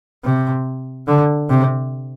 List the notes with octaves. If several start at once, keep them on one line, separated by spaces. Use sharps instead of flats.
C3
D3
C3